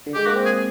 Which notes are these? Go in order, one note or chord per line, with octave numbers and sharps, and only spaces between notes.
D3
G#3 G4
A#3 F#4
C4
G#4